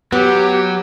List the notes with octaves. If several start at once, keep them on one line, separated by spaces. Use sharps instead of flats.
F#3 B3 G4